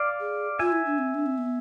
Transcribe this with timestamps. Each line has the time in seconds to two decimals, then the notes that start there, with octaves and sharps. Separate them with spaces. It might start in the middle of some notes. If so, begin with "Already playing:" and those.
Already playing: D5 F5
0.20 G#4
0.59 F4 E5 G#5
0.72 E4
0.86 D4
0.98 C4
1.14 D4
1.26 C4
1.38 B3